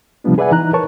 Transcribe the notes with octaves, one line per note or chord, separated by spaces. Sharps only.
C3 F3 G3 B3 D4
G#4 B4 D5 E5 F#5 G#5
E3 D#4 A#5 F#6
A#4 B4 C#5 A5 C#6